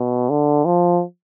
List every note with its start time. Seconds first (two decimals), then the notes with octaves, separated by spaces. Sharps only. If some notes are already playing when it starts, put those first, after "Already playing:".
Already playing: B2
0.30 D3
0.65 F3